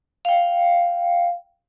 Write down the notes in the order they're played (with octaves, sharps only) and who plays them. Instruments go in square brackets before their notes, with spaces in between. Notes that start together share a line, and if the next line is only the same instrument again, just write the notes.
[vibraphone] F5 G5